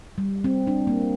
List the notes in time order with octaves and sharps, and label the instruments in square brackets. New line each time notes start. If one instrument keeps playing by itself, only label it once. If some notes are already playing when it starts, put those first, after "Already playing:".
[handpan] G3
C4
D4
A#3